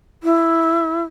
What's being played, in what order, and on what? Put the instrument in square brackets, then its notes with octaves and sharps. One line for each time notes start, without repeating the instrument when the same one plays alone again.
[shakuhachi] E4